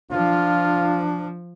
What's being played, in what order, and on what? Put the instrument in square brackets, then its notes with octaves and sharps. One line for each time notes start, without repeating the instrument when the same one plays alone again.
[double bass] F3 [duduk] D4 [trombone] F4